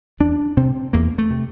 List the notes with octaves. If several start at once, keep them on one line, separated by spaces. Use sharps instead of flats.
E2 D4
C3 C4
E2 A#3
A3
C3